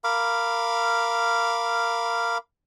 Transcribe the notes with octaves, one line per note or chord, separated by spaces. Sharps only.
A#4 F5 B5 D6